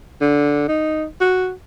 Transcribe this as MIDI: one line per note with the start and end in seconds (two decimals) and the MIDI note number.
0.21 0.65 50
0.68 1.06 63
1.20 1.52 66